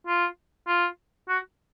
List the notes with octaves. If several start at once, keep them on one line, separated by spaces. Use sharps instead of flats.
F4
F4
F#4